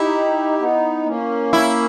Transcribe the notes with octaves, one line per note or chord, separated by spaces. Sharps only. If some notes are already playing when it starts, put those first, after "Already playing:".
Already playing: D#4 E4 G4
B3 D#4
A#3 C#4
E4